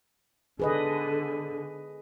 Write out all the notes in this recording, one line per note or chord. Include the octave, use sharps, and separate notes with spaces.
D3 G#4 B4 D#5